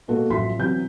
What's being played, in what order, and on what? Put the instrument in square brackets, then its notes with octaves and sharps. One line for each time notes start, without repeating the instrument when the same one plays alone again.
[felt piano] B2 G#3 A#3 F#4 A4
A1 F3 F#3 E5 C6 B6
C3 E3 F#3 G6